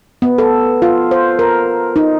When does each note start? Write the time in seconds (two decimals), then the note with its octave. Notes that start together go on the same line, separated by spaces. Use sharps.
0.22 B3
0.38 A4
0.82 F4
1.11 C5
1.39 A#4
1.96 D#4